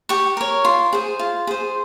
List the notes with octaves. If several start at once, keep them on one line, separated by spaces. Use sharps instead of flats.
G4 C#6
A#4 C#5
F4 C6
G#4 C5
F4
G#4 C5